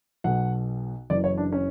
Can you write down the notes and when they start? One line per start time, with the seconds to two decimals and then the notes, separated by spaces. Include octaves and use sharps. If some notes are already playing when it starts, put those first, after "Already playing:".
0.24 B1 B2 F#5
1.10 F#1 F#2 E3 D5
1.24 C#5
1.37 D4
1.52 C#4